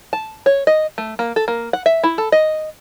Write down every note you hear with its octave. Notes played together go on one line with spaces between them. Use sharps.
A5
C#5
D#5
A3
A#3
A4
A#3
F#5
E5
E4
A4
D#5